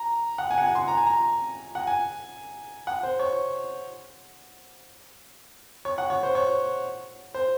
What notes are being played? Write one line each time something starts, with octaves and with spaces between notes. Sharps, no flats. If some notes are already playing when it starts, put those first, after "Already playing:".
Already playing: A#5
F#5
G#5
F#5
G#5
C6
A#5
G#5
A#5
F#5
G#5
F#5
C5
C#5
C#5
F#5
C#5
C5
C#5
C5